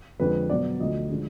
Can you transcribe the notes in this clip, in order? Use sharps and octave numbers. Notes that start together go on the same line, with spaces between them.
F2 D3 G#3 B4
B2 F#3 B3 D5
D2 D3 F3 D#5
D3 F3 G#3